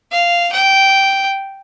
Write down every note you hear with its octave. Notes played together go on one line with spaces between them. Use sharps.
F5
G5